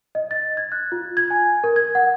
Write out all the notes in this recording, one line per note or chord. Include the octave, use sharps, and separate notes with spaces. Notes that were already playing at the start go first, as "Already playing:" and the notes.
D#5
A6
G#6
F#6
F4
G#6
G#5
A#4
G#6
F#5